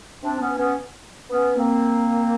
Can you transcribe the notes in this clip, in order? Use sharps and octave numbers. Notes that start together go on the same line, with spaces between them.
C4 D4
B3 C#4
B3 C#4
B3 C#4
A#3 C4